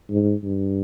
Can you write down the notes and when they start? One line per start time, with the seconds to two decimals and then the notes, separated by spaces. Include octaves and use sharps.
0.10 G#2
0.43 G2